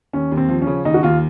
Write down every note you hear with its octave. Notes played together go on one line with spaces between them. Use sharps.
D#2 C#4
D#2
C4
F3
C#4
C#3
D#2 D#4
F#4
D#2 F4